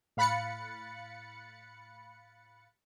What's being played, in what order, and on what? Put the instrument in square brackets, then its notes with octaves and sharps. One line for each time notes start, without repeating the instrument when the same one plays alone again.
[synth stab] A2 F5 B5 F#6 A6 C#7